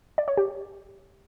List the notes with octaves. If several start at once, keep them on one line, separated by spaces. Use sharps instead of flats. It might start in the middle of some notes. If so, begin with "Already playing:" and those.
D5
C#5
G4